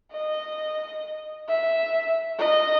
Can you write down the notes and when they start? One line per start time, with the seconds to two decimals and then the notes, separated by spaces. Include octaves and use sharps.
0.12 D#5
1.48 E5
2.39 D#5